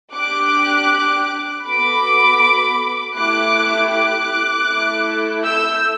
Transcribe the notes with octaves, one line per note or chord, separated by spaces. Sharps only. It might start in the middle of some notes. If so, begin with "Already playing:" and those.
D4 G4 D6 F#6
B3 F#4 A4 B5 D6
A3 E4 G4 D6 F#6
D6 F#6
A3 E4 A4
E6 G6